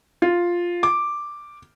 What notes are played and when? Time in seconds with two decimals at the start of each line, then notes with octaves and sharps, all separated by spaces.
0.22 F4
0.83 D6